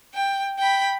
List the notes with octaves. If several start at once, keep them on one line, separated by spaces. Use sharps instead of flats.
G5
G5 B5